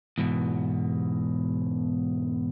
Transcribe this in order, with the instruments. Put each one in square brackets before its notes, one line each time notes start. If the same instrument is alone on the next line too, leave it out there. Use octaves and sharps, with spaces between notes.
[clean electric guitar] E2 G#2 B2